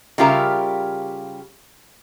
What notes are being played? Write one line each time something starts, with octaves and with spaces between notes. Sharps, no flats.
C#3 G3 F4 G4 A#4 E5